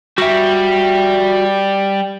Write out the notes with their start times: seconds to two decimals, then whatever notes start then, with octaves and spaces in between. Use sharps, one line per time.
0.18 G3 F#4 E5